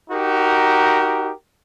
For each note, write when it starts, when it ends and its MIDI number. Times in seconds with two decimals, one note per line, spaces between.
0.10 1.32 63
0.10 1.32 66
0.10 1.32 67
0.10 1.32 70